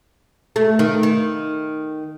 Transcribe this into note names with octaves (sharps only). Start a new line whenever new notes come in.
A3
D#3
D#3